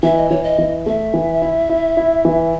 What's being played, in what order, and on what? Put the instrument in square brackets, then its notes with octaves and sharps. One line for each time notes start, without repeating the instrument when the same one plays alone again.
[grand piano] E3 [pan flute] E5
[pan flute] D#5
[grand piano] E3 [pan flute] C#5
[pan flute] D#5
[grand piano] E3
[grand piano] A3 [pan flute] E5
[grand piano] E3
E4
E4
E4
E3